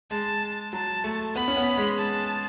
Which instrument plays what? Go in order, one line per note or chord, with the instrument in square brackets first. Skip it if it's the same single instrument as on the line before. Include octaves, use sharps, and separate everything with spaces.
[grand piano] G#3 [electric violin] A5
[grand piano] F#3 [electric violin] A5
[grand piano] A3
[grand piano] B3 [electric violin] B5
[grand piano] C#4
B3
G#3
[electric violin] A5